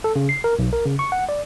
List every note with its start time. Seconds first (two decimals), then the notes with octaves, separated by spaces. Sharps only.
0.04 A4
0.16 C#3
0.29 C7
0.44 A#4
0.59 B1
0.73 A#4
0.86 C#3
0.99 C#6
1.12 F#5
1.29 D5